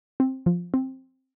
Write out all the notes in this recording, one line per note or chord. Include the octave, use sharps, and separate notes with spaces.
C4
F3
C4